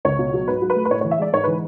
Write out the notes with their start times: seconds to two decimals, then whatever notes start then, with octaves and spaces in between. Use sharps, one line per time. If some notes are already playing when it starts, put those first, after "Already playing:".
0.05 C#2 C#5
0.19 B2
0.34 F#3
0.48 G#2 B4
0.62 F#3
0.70 B4
0.76 A3
0.85 B4
0.91 A2 C#5
1.01 E3 C#5
1.11 E5
1.19 G#3 D5
1.33 G#2 C#5
1.44 E3 B4